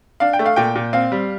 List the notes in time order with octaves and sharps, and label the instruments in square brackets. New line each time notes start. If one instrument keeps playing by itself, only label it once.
[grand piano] D4 F5
G5
A3
F5
A#2 G5
A#2
C4 F5
G3